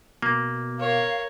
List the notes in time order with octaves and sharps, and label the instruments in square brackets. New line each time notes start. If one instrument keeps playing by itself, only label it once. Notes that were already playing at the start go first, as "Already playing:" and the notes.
[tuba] B2 [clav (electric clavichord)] A#3
[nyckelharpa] A#4 C#5 [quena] F5